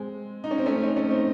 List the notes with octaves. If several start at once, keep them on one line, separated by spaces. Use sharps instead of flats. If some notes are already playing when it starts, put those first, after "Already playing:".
Already playing: G#3 C4
D#4
C#4
C4
A3 C#4
C4 D#4
A3 C#4
C4 D#4